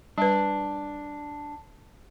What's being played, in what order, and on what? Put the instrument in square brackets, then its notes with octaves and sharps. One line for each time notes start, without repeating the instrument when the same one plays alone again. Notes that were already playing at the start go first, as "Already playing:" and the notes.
[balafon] G3 B4 [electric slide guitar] D4